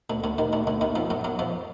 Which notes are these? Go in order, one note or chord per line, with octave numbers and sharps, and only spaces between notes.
D2 D3
D2 D3
D#2 D#3
D2 D3
D2 D3
D#2 D#3
F2 F3
F#2 F#3
F#2 F#3
F2 F3